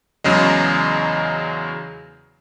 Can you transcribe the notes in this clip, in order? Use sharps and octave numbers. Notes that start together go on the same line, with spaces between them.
E2 C#3 F#3 G#3